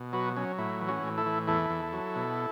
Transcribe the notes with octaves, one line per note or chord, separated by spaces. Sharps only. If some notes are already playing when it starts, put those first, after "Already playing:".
Already playing: B2
F#3 F#4 B4
F#3 C#4
A2 E4
E3
C#4 F#4
A2
E4 A4
E3
E2 E4 A4
E2
F#3
B2